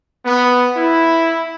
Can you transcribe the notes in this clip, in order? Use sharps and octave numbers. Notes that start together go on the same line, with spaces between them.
B3
E4